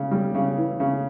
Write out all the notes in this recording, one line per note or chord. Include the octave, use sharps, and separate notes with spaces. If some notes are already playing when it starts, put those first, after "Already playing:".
Already playing: C#3
G3
C#3
E3
C#3